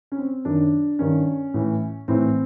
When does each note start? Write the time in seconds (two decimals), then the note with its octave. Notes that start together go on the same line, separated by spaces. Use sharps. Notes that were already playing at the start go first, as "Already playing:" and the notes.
0.12 C#4
0.18 C4
0.45 F#2 D#3 D4
0.99 G2 D#3 C#4
1.54 A2 E3
2.08 A2 E3 C4